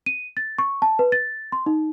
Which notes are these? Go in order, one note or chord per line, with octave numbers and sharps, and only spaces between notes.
D#7
A6
C#6
A5
B4
A6
C6
D#4